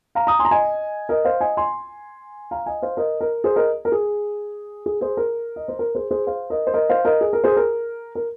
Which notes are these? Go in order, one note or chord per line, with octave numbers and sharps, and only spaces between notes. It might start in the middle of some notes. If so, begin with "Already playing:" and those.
F5 A#5
A#5 D#6
G#5 C6
A#5
D#5 G#5
A#4 D#5
C5 F5
D#5 G#5
G#5 C6
F5 A#5
D#5 G#5
C5 F5
A#4 D#5
A#4
G#4 C5
A#4 D#5
A#4
G#4
G#4
G#4 C5
A#4
D#5
C5
A#4
G#4 C5
G#4 C5
C5 F5
A#4 D#5
C5
A#4 D#5
C5 F5
A#4 D#5
G#4
A#4
G#4 C5
A#4
A#4